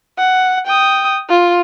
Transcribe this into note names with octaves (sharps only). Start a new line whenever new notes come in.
F#5
G5 D#6
F4